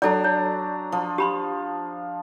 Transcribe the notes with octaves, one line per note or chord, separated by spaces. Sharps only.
F#3 D4 A4 D5 A#5
C#5
F3
G4 B5 C6